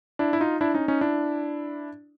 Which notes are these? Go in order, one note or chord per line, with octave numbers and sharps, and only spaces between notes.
D4 E4
E4
D#4 F4
D4 E4
C#4 D#4
C#4 D#4
D4 E4